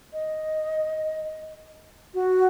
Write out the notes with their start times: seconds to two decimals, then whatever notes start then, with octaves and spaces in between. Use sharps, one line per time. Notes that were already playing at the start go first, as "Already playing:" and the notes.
0.13 D#5
2.14 F#4